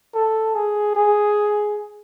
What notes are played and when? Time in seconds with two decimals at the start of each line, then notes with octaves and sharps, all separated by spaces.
0.15 A4
0.55 G#4
0.95 G#4